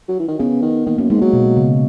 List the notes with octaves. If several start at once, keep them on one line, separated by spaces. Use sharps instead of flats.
F#3
E3
D#3
C#3 B3
D#3
D#3 A#3
F#2 A#3
G#2 G#3
F#3 A#3
B2
C#3